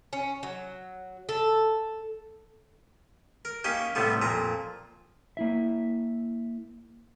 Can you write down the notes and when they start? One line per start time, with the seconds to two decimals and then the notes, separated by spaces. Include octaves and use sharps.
0.13 C#4
0.43 F#3
1.29 A4
3.45 A#4
3.64 A#3 C#4 D#4 G4 E5
3.95 A2 C3 G3 A3 B3
4.22 F2 A#2 A#5
5.37 A#3 E4 E5